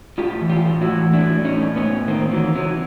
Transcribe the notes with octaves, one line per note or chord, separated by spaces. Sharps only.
A2 F4 G4
E3
F4 G4
A2
E4 F#4
E3
A2 D4 E4
A2
C#4 D#4
A2
B3 C#4
A2
D#3 A#3 C4
D#3 E3 F#3
C3 E3 F#3